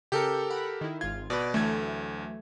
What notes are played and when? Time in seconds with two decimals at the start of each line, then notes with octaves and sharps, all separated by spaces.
0.12 C#3 G4 A4 A#4 G6 C#7
0.50 F#5 B5
0.81 D#3 E4
1.01 G#1 F4 G#6
1.30 B2 B4 D5
1.54 D2 E3 F#3 A3 G#6